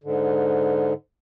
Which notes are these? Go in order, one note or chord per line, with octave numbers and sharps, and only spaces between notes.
G#2 D3